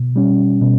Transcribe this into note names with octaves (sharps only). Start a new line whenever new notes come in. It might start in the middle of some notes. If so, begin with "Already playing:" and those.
Already playing: B2
G3 C#4
B2